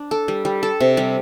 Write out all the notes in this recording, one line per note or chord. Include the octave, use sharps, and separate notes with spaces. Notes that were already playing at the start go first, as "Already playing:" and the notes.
Already playing: D4
A4
G3
G3
A4
C3
G3